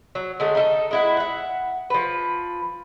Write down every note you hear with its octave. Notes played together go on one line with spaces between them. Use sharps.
F#3
D3 G#3 A3
D#4 E4 A4
G#3 E4 F#4
E5 F#5
F3 B4